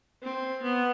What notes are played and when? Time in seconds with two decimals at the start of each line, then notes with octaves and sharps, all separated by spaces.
0.23 C4
0.62 B3